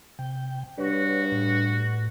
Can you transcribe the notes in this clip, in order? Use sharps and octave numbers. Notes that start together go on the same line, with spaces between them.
C3 G5
G2 F#4 B4 C#5
A2